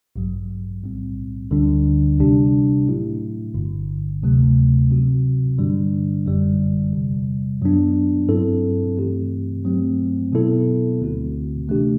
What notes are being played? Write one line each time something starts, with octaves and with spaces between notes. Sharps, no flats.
A1 G2 F#3
B1 A2 G3 C4
D2 D3 G3 D4
C2 C3 G3 D4 G4
A2 F#3 A3 E4
G1 G2 D3
D2 C3 F#3 A3
C2 C3 F#3 C4 F#4
G2 D3 G3 D4
G1 F#2 D3 G3
E2 C3 G3
F#2 F#3 B3 D4
G2 F#3 C4 E4 A4
G2 E3 A3 C4 G4
G2 F#3 A3 C4
B2 F#3 B3 E4 A4
D2 D3 A3 C4 F#4
C3 E3 A3 D4 G4